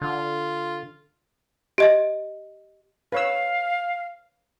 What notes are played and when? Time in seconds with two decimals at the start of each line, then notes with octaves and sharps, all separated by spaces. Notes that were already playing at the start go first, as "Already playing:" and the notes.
0.02 D3 F4
1.78 G4 D#5 E5
3.12 B4 C#5 F5 E6